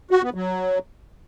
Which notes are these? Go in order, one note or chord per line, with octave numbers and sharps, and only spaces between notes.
F#4
B3
F#3